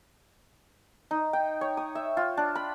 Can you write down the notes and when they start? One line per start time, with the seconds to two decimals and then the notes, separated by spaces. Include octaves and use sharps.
1.11 D#4
1.33 G5
1.61 C#5
1.77 D#6
1.95 E5
2.17 F4
2.37 D4
2.55 B5